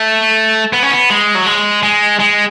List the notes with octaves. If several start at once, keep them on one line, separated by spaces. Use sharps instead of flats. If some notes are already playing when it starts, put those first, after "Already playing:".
Already playing: A3
B3
C#4
B3
G#3
F#3
G#3
G#3
G#3